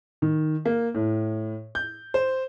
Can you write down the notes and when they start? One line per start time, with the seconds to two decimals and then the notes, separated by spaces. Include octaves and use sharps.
0.22 D#3
0.65 A#3
0.95 A2
1.75 G6
2.14 C5